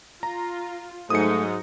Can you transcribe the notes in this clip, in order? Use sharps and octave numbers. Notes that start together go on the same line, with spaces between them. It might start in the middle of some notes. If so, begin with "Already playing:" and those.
F4 A#5
G#2 F#3 A3 D#4 D#6 C#7